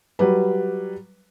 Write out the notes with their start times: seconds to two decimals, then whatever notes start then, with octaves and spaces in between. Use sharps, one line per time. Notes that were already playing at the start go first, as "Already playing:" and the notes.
0.19 F#3 G3 B4